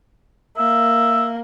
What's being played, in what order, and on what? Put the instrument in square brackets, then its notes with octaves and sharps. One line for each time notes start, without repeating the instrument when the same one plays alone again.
[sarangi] A#3 [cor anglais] E5